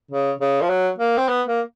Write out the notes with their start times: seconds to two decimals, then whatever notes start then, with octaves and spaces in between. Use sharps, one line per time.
0.11 C#3
0.41 C#3
0.61 F3
0.69 F#3
0.98 A#3
1.18 C4
1.28 B3
1.47 A#3